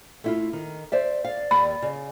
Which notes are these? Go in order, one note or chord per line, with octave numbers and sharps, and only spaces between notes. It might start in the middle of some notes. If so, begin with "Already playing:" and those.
A3 E4 F4
D#3
C5 D5 E5
D5 F5
D#2 B5
C#3